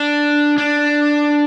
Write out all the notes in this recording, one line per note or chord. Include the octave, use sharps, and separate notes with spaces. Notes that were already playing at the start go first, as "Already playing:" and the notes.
Already playing: D4
D4